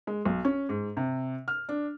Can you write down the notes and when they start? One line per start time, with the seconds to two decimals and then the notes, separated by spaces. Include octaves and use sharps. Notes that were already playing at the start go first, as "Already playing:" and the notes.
0.07 G#3
0.26 B1
0.45 C#4
0.69 G#2
0.97 C3
1.48 F6
1.69 D4